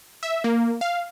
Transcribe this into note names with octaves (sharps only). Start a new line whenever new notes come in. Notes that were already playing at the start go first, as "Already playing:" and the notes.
E5
A#3
F5